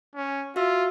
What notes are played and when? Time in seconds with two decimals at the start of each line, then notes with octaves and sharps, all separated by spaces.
0.15 C#4
0.56 F4 F#4 E5 E6